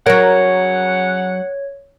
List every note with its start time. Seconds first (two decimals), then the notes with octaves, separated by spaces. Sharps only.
0.06 C#3 F#3 A#4 C#5 F#5